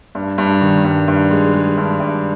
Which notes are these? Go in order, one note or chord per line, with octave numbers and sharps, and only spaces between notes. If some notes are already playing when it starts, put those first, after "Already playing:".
G2
G2
D#3
G2
G2
G#3
G#3
G2
G2